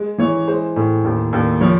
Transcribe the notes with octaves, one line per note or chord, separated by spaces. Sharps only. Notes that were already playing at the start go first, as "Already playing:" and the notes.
Already playing: G#3
E3 C#5
G#3 C5
A2
D#2
D#2
F3 C#5